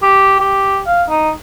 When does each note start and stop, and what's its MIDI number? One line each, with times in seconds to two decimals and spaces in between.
0.02 0.36 67
0.40 0.80 67
0.86 1.03 77
1.09 1.30 63